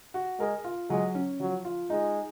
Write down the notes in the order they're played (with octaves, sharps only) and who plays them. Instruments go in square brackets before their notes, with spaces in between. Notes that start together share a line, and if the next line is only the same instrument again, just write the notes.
[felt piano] F#4
[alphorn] G#3 [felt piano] A#4
[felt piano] F4
[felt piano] F#3 [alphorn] G#3
[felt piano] C#4
[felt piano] F3 [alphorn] F#3
[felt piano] F4
[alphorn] G#3 [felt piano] D#4